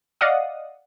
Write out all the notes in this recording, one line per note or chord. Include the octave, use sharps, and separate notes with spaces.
D5 D#5 F5 F#5 D#6